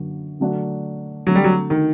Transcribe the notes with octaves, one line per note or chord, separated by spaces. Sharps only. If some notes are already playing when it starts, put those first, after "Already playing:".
Already playing: F#2 D3 F#3 A#3 F#4
D3 F#3 A3 D4 F#4
D3 F#3 A3 C4 F#4 A4
G3
F#3
D#3